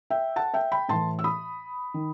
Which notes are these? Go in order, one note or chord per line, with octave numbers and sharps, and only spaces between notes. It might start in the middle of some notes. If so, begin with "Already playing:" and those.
E5 G5
F#5 A5
E5 G5
G5 B5
A2 E3 A5 C6
E6
B5 D#6
D#3